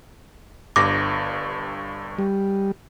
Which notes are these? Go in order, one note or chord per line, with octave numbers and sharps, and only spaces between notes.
G1 G2 D6 A#6
G3